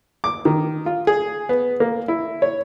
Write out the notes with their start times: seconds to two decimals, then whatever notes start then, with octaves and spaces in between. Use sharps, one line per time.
0.24 D6
0.45 D#3
0.86 F4
1.07 G#4
1.49 B3
1.80 A#3
2.08 E4
2.42 C#5